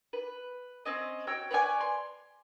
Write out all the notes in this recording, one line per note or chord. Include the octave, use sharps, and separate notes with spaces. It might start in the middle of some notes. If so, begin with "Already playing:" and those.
B4
C4 C#4 D#5
F#4 C#5 G5 E6
B4 C#5 D5 G#5
C6